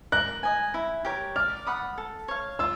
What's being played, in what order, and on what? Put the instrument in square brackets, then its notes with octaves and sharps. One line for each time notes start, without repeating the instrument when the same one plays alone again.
[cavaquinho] A#4 [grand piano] F#6
[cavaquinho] D#5 G#5
E4
G4 A#4 C#5
[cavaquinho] D5 [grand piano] F6
[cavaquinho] F#5 B5 D#6
A4
C#5 F5
[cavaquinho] F4 [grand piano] E6